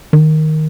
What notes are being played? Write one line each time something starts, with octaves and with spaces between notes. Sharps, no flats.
D#3